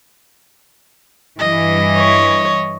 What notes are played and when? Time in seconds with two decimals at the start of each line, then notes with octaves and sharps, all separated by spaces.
1.39 G2 E3 D#5
1.96 C#5